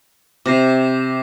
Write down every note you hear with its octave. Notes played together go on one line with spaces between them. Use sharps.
C3 D6 A#6 C7